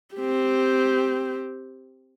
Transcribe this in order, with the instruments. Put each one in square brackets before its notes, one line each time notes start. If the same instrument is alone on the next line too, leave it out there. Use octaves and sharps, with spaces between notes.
[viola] C4 G4